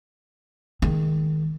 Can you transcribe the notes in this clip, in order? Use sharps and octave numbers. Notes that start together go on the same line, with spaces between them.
D#3 G#3